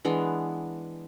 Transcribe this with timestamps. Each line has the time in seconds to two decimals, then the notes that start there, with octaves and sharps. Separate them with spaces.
0.05 E3 G#3 B3 D4